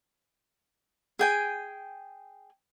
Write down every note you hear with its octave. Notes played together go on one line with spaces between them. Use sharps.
G#4 G5 G#5